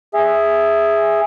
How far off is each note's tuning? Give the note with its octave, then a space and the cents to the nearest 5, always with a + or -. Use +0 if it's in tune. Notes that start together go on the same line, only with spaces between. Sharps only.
G#4 -5 E5 +0